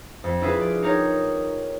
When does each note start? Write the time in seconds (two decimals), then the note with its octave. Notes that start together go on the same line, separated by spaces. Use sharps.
0.24 F2
0.41 D4 E4 F4 G#4 B4
0.61 D5
0.82 D#4 G4 A#4 C#5